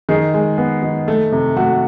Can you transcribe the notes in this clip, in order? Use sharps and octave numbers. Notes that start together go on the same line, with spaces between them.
D#3 G#4
G#3
B3
D#3
A3
C3
A3 F#4